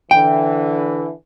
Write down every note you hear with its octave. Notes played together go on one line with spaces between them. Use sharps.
D3 E3 G5